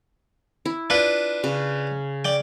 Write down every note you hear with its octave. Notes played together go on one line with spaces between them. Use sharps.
E4
D4 F4 B4
C#3
D5 G5